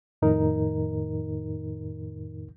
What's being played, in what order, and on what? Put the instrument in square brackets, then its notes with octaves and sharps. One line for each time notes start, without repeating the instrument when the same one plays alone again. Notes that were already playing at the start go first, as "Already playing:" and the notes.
[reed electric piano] F2 A2 D#3 D#4 A#4